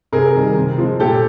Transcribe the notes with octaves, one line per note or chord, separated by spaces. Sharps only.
C3 G#4 A#4
D#3 G3
C3
F3 G#3
A#2 G4 A4